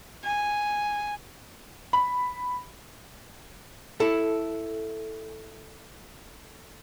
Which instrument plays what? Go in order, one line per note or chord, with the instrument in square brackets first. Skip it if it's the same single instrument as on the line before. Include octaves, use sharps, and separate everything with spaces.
[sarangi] G#5
[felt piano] B5
[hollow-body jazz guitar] E4 [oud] A4